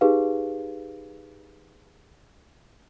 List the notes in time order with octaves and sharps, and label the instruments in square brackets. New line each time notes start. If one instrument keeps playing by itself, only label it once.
[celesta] D#4 G4 G#4 B4 F5